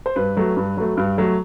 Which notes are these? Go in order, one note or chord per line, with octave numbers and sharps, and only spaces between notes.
C5
G2 B4
F#3 A3
G2
F#3 A3
G2
F#3 A3